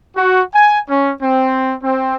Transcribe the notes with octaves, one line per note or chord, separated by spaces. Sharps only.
F#4
G#5
C#4
C4
C4